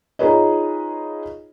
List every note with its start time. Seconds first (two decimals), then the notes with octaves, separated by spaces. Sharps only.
0.19 D#4 F4 G#4 B4 C#5 D#5